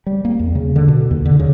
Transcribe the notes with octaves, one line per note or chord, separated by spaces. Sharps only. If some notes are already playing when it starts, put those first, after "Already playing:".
G3
A#3
E2
C#3
D3
B2
D#2
D3
C#3